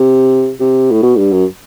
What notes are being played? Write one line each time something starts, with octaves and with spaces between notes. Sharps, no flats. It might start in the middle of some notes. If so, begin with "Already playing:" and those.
Already playing: C3
C3
A2
B2
G2
F#2